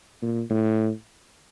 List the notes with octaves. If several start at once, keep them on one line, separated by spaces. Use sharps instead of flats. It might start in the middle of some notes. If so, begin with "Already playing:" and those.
A#2
A2